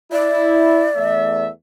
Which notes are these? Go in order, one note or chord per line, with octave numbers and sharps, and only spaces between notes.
E4 D5
E2 A3 E5